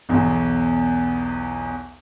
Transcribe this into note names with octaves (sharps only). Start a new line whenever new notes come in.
B1 E2